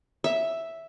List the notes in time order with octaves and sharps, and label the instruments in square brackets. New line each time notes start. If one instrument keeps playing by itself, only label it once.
[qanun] E5